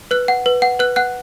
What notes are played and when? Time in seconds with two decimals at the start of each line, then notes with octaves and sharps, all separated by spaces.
0.11 B4 F#6
0.28 F#5
0.46 B4
0.62 F#5
0.79 B4 F#6
0.96 F#5 F#6